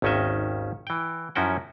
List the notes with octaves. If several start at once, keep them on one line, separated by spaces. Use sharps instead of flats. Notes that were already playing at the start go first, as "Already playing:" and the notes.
G#1 D#2 D#3 C#4 D#5 E5
E3 G5
F#2 F3 C#4 E4 F#4 G5